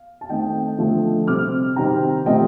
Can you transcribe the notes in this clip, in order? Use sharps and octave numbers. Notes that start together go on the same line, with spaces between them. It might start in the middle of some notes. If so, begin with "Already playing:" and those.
Already playing: F5
A5
D#3 A3 C4 D#5 G5
D3 F3 A3
C3 G3 C4 D6 F6
C3 D#3 G3 C4 G5 A#5
C3 F3 A3 C4 D#5 G5